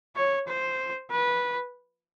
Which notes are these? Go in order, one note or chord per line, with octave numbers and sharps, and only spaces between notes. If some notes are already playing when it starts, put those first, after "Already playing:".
C#5
C5
B4